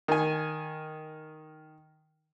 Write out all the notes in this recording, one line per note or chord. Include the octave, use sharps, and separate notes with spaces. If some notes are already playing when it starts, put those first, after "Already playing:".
D#3 G#5